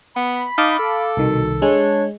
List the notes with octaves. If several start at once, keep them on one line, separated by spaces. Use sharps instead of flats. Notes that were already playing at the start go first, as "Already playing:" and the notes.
B3 B5
D#4 F5 A5 D6
A4
C2 B2 D#3
G#3 D4 C#5